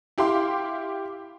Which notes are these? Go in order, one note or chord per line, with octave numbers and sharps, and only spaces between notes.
E4 G4 F5 C6 D6